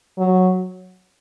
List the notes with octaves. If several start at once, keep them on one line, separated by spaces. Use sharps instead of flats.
F#3